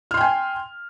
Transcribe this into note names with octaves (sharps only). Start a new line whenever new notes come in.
G5 G#5 C6 F6